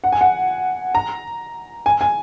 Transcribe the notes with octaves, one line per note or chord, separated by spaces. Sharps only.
F#5
G#5
F#5
A#5
G#5
G#5